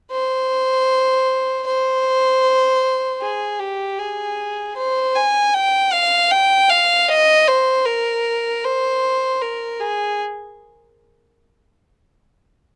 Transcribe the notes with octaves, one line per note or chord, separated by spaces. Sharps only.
C5
C5
G#4
G4
G#4
C5
G#5
G5
F5
G5
F5
D#5
C5
A#4
C5
A#4
G#4